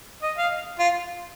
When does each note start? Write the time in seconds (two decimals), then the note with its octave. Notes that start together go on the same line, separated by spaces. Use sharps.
0.23 D#5
0.38 F5
0.79 F4